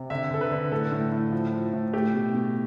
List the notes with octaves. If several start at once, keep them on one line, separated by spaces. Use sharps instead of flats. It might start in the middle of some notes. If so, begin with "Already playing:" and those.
Already playing: C3
D3 E5
D3 A4
B4
D3
A2 A4
A2
A2
F3
F3
A2
A3 G4
B2
B2